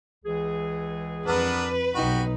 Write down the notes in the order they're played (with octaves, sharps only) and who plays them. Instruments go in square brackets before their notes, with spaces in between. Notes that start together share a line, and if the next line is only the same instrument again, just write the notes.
[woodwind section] C#2 E3 G#4
[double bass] F2 [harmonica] B3 D4 A#4 [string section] B4
[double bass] B1 D#4 [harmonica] F#4 G4